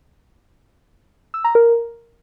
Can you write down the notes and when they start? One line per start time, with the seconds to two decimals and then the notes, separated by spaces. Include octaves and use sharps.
1.34 E6
1.44 A#5
1.55 A#4